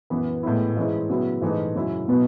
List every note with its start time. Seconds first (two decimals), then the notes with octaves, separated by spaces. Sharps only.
0.10 F#2 E3 B3
0.43 A2 G#3 B3 E4
0.76 G#2 E3 G#3 C#4 E4
1.10 C#3 F#3 B3 E4
1.41 G#2 E3 A3 D#4
1.75 F#2 C#3 F#3 C#4 E4
2.08 B2 F#3 B3 D#4